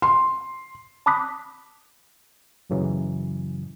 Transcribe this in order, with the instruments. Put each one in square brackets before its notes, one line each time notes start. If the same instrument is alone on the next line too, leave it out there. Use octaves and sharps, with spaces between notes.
[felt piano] C6
[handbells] A5 B5 D6 D#6 F#6 B6
[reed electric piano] F#2 A#2 C#3 E3 F#3